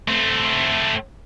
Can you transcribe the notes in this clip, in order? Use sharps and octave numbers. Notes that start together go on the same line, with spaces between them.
A3 C4